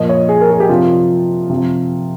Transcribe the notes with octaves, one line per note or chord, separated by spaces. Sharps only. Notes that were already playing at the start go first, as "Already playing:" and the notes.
Already playing: A#2 F3 D#5
C#5
G#4
A#4
G#4
G4
C3 F3 F4
C3 F3